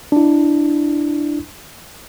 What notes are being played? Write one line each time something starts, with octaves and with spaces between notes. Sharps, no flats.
D4 E4